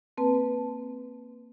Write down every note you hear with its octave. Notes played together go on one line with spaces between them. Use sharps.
A#3 C4 B4 A5